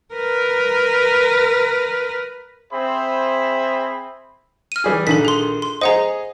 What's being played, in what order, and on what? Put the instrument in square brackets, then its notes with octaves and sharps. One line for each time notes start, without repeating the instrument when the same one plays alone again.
[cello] A#4 B4
[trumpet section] C4 G#4 C5 E5 B5
[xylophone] F6 D#7
[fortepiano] E3 G3 G#4
[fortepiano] A#1 D#3 [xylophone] A4 B6
[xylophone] G#4 C6
C6
[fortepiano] G#4 D#5 [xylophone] C5 F#5 A#5